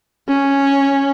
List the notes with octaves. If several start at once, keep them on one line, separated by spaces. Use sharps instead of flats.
C#4